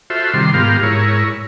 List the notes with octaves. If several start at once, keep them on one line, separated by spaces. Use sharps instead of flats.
F4 F#4 A4 C5 E5
C3 D#3 G3 C6
G#2 B3 F4 G4 A#4 F5
G#2 E4 A#4 C#5